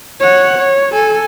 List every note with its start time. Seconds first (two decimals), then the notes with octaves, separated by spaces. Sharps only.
0.20 C#5 F#5
0.58 C#5
0.93 A4 G#5